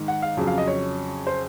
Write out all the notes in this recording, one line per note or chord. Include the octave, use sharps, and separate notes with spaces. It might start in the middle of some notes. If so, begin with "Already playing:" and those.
Already playing: G#2 D#3
F#5
F5
F2 C#3 F#3
F5
D#5
C#5
C5